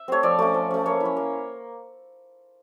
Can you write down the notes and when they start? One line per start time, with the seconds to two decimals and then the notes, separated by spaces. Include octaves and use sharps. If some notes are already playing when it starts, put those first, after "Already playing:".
Already playing: E5
0.08 A3 C4 C#5
0.23 F3 D5
0.39 A3 C#4
0.54 F3
0.71 A3 C#4
0.85 A#3 C#5
1.00 C#4 E4
1.17 A#3